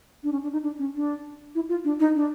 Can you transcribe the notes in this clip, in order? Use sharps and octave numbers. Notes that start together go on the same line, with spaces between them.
D4
C#4
D4
D#4
D4
C#4
D4
E4
F4
D4
D#4
D4